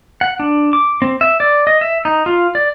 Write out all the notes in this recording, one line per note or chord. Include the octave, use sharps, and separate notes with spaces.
F#5
D4
D6
C4
E5
D5
D#5
E5
D#4
F4
D5